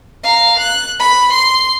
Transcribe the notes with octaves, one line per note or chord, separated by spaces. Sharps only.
F5 A#5
F#6
B5
C6